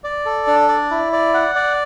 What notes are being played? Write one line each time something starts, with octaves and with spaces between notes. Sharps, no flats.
D5
A4
D4
D5
E4
D5
F#5
D5